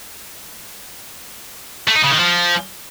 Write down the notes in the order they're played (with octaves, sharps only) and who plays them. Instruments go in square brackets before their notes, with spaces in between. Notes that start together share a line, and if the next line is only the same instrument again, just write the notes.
[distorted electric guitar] A3
D#4
C#3
D#3
F3